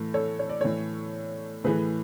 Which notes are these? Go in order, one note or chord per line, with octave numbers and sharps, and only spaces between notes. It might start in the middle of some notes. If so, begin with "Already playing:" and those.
Already playing: A2 E3
A4 C#5
C#5
D5
A2 E3 A4 C#5
A2 E3 G#4 B4